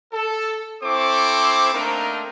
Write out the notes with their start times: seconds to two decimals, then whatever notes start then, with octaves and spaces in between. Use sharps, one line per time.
0.13 A4
0.83 C4 E4 A4 C5 C#6 D6
1.73 A3 A#3 C4 D4 D#4 A#4